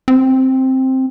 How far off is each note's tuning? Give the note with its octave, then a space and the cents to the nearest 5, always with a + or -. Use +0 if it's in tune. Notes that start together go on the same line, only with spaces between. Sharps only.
C4 +5